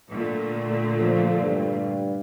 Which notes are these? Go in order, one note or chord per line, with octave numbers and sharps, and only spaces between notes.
A#2 D3 A3
F3
G2